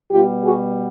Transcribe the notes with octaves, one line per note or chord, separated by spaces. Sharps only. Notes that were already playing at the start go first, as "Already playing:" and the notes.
B2 G3 B3 F4 G4
F#4 G#4